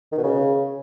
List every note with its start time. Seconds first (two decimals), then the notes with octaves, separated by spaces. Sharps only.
0.12 D#3
0.17 B2
0.23 C#3